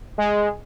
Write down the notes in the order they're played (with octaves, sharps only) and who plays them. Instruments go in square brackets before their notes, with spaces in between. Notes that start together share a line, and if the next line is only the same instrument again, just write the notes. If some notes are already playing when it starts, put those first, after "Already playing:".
[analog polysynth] G#3